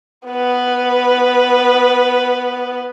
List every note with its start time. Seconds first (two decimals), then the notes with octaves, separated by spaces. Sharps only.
0.28 B3 B4